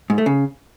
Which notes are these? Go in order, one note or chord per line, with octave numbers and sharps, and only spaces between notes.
G#2
A3
C#3